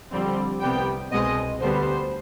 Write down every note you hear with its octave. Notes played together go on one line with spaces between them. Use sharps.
F2 D3 G3 C4
C2 C3 G3 B3 G5
C2 B2 G#3 C4 D#5
D2 D3 G3 B3 C5